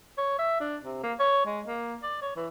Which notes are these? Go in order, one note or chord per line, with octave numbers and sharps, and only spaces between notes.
C#5
E5
D4
C3
A#3
C#5
G#3
A#3
D5
C#5
E3